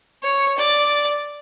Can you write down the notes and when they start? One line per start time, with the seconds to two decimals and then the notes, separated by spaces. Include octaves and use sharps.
0.23 C#5
0.58 D5